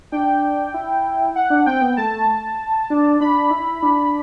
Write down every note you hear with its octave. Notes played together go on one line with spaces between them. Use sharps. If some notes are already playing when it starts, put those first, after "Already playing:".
D4 G5
E4
F#5
D4
C4 G5
B3
A3 A5
D4
D4 B5
E4
D4